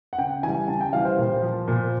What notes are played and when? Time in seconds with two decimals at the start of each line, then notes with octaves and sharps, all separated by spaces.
0.13 F#5
0.18 C#3 G5
0.43 E3 G3 G#5
0.68 C#3 A5
0.81 G5
0.93 E3 G3 F5
1.05 C5
1.18 A#2
1.42 F3
1.68 A#2